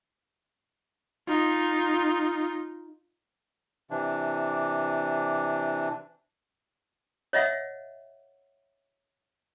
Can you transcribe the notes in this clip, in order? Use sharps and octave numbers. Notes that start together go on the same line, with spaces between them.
D#4 F4
C3 E3 D4
C#5 D#5 E5 F#5